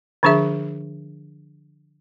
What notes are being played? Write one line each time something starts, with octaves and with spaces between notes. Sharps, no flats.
D3 F3 D4 G#4 E5